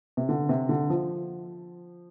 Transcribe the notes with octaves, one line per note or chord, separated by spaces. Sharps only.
C3
D3
C3
D3
F3